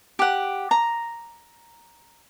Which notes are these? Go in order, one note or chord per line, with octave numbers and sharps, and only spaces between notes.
G4 F#5
A#5